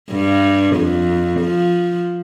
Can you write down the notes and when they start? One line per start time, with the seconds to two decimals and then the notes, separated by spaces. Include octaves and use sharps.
0.11 G2
0.75 F2
1.40 F3